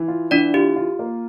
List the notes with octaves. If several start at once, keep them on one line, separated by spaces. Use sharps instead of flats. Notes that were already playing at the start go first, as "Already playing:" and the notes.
Already playing: E3
F4
E3 D4 D5
F4 G4
F4
A#3